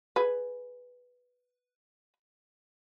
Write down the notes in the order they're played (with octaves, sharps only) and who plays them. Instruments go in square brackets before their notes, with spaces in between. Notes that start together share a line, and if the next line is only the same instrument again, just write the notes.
[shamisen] G#4 B4